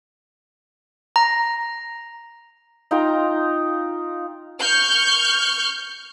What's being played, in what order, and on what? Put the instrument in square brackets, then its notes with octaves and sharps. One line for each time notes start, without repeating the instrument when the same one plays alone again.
[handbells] A#5
[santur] D#4 F4 G5 A#5
[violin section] C#6 F6 G6